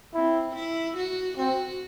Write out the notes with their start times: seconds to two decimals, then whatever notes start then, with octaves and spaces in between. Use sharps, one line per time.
0.14 C4 E4
0.55 E4
0.97 F#4
1.37 C4 F#4